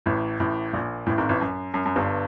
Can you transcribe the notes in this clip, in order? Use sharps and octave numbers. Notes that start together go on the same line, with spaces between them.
A1 A2
A1 A2
A#1 A#2
A1 A2
G#1 G#2
A1 A2
F#2
F#2
F#2
G1 G2